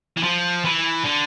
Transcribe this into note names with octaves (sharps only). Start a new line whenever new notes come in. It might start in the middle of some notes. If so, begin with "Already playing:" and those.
E3
F3
E3
D3